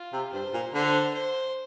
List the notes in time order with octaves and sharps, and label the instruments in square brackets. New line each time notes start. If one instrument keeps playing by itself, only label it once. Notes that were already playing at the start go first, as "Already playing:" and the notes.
Already playing: [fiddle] F4
[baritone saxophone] C3
[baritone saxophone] G2 [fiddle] C5
[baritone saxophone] A#2
[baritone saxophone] D3 [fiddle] C5
[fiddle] C5